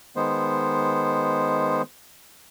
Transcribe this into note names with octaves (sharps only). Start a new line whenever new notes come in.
D#3 G#3 B3 C5